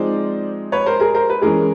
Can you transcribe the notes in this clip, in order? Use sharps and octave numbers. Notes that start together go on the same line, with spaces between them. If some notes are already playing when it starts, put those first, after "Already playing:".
Already playing: F3 G#3 C4 D#4 C5 D5
B4 C#5
A#4 C5
G#4 A#4
A#4 C5
B4
E3 G#3 C#4 G#4 A#4